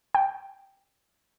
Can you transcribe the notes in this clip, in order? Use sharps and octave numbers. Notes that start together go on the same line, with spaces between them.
G5